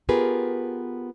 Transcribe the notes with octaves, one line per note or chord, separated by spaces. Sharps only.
B3 F4 G4 G#4 A#4 B4